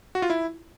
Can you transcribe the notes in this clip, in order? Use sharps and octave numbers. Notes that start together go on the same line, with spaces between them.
F#4
F4
E4